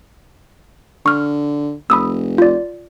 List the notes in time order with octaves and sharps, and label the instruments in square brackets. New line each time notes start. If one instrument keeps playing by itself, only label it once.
[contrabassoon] D3 [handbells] C#6 F6
[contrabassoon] F1 [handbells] B5 D#6 E6
[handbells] F4 D5